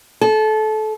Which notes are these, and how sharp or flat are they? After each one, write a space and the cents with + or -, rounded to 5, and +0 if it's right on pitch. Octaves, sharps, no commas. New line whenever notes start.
A4 -25